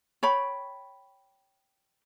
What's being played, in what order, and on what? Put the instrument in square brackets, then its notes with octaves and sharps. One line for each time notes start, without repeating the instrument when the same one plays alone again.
[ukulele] C#5 G5 B5